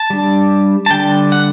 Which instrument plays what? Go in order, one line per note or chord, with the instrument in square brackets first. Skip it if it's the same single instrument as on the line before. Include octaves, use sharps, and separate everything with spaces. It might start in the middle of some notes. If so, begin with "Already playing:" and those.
Already playing: [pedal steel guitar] A5
G3 D4
A5
D3 G3 D4 G5
F#5